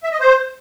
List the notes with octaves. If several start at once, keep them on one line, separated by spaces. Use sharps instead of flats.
E5
D#5
C5